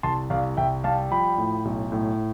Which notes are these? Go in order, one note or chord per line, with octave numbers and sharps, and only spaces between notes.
C2 A5 C6
C2 D5 F5
C2 E5 G5
G3 F5 A5
F3 G5 B5
A2
B1
A2